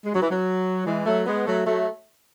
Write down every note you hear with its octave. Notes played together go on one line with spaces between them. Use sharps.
G#3
F#3
E3
F#3
E3 G#3
F#3 A3
G#3 B3
F#3 A3
F#3 A3